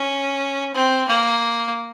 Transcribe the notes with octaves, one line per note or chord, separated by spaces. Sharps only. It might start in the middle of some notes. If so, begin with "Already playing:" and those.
Already playing: C#4
C4
A#3